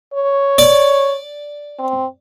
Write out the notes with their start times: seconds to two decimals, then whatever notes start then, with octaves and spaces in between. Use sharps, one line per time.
0.14 C#5
0.58 D5
1.79 C4